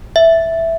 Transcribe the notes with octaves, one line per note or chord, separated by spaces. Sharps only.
E5